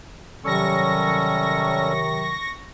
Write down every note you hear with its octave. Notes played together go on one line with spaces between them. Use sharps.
C3 D#3 F#3 G3 C#4 A4 C#6 A#6